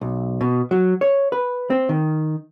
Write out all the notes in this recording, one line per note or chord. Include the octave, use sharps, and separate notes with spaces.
B1
B2
F#3
C#5
B4
C4
D#3